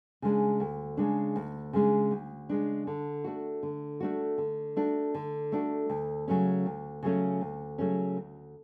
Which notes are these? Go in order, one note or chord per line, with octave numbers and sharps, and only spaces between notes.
C#3 G#3 D4
D2
C#3 G#3 D4
D2
C#3 G#3 D4
D2
C#3 G#3 D4
D3
A3 D4 F#4
D3
A3 D4 F#4
D3
A3 D4 F#4
D3
A3 D4 F#4
D2
C#3 F#3 A3 C#4
D2
C#3 F#3 A3 C#4
D2
C#3 F#3 A3 C#4
D2